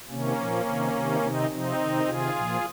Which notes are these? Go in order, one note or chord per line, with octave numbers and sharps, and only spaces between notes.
C3 D#3 A#3 C#4
A#2 F3
C3 D#3
C3 D#3
C3 D#3 C4 D#4
C3 F3 C4 D#4
C3 D#3
C3 D#3 F4 G#4
A#2 F3